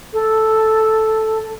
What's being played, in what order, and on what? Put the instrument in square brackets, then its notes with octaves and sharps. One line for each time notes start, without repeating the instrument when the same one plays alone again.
[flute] A4